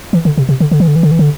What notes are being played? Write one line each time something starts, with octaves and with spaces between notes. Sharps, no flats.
E3
D3
C3
C3
D3
D3
E3
D3
E3
D3
E3
D3